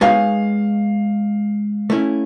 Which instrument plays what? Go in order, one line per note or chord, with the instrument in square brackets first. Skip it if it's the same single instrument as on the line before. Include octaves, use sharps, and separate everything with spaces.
[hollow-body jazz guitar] G#3 B3 D#4 G#4 C#5 [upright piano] F5
[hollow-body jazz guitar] A3 C#4 E4